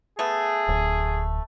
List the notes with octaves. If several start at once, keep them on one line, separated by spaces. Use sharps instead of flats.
A3 B3 G#4
D1